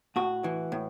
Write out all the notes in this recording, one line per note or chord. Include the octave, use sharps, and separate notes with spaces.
A2 F#4
E3
A2